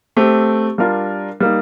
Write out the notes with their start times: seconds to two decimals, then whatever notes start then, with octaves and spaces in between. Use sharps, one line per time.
0.17 A3 C4 G4
0.78 G3 D4 F4 A#4
1.40 G3 A#3 D#4